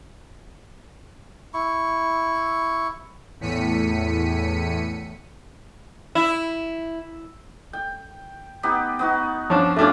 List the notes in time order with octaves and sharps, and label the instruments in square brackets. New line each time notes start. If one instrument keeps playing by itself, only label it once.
[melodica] E4 C#6
[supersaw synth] E2 A2 B6 C#7 D#7
[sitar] E4
[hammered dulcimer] G5
B3 D#4 G4
B3 D#4 F#4
[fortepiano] F3 C#4 D4
[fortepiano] A3 D4 F4 [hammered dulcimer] C#4 G4 A4